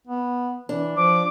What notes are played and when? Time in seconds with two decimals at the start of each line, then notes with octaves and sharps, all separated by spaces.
0.07 B3
0.69 E3 D4
0.97 F3 D6